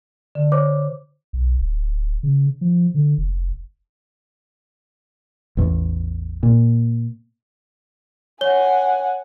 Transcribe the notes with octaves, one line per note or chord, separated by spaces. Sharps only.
D3
C5 C#5 D6
B1
D1
C#3
F3
D3
F1
A1 E2
A#2
C#5 F#5 G#5 G7